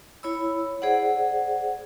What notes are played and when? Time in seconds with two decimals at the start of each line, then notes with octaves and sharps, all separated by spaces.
0.23 E4 C#5 B5 E6
0.82 G#4 C5 D5 F#5